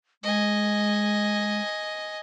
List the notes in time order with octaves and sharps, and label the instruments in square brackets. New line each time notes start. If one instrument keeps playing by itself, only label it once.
[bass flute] G#3 [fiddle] D#5 G#5